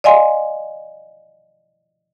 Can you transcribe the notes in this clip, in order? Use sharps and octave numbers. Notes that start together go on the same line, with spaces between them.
D5 D#5 F5 G#5 C6